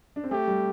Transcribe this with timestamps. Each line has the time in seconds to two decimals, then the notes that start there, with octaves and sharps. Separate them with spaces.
0.16 D4
0.24 C4
0.31 A3 G4
0.48 G3